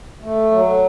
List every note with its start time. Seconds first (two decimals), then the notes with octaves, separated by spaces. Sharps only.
0.22 A3
0.52 F#3